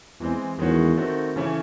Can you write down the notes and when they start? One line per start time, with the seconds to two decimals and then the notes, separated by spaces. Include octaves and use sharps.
0.20 E2 E3 G#3 C4
0.59 E2 D#3 G#3 C#4 F#4
0.97 D#3 A3 C4 F#4
1.36 C#3 E3 A3 C#4 E4